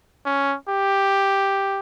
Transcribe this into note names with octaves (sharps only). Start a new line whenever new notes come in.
C#4
G4